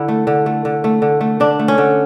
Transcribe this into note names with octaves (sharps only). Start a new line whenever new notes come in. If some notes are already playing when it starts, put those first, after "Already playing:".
Already playing: D3 E4
A3
D3
A3
D3
A3
D3
A3
D3 D4
A3
C#4
D3